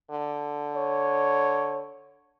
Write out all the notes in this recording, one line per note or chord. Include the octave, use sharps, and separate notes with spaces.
D3
C#5